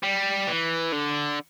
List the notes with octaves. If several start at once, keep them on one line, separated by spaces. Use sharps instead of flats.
G3
E3
D3